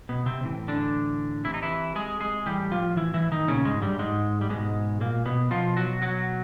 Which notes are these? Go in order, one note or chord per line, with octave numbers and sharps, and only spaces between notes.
B2 B3
C3 C4
A2 E3
D3 D4
C3 E3 E4
D#4
E3 E4
G#3 G#4
G#3 G#4
A2 E3 G3 G4
F3 F4
E3 E4
E3 E4
D#3 D#4
A#2 C#3 C#4
G#2 G#3
G2 G3
G#2 G#3
G3
G#2 B2 G#3
A#2 A#3
B2 B3
B2 F3 F4
F#3 F#4
F#3 F#4